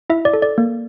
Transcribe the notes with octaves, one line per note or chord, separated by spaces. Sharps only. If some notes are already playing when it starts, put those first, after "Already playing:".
E4 E5
D5
A4
D5
A#3